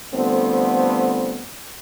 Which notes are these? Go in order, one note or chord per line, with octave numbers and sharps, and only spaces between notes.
D3 F3 G3 A3 B3 C4